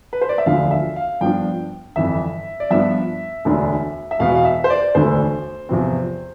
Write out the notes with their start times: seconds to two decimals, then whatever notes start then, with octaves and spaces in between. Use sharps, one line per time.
0.13 B4
0.21 C5
0.29 D5
0.38 E5
0.46 E1 D2 D3 F3 F5
0.71 E5
0.96 F5
1.21 G2 F3 B3 D4 G5
1.96 G1 F2 E3 E5
2.60 D5
2.71 G2 F3 B3 D4 E5
3.45 E1 D2 D3
4.11 E5
4.19 E1 E2 B2 B3 F5
4.35 F5
4.45 E5
4.64 C5
4.70 D5
4.95 E1 D2 D3 A3 C5
5.69 E2 C3 F3 C4